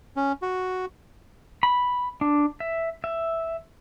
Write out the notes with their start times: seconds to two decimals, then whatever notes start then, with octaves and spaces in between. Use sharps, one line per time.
0.17 C#4
0.42 F#4
1.63 B5
2.21 D4
2.60 E5
3.04 E5